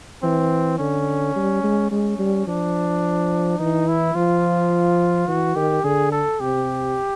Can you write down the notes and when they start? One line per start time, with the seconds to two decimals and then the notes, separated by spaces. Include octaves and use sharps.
0.23 E3 C4
0.78 D3 C#4
1.36 G3
1.64 G#3
1.91 G#3 C#4
2.19 G3
2.47 F3 D4
3.59 E3 D#4
3.88 E4
4.15 F3 F4
5.28 E3 F#4
5.56 D#3 G4
5.84 D3 G#4
6.12 A4
6.40 C3 G4